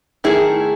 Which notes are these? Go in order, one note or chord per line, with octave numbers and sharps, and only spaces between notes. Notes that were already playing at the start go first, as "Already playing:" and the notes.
D#3 A3 E4 G#4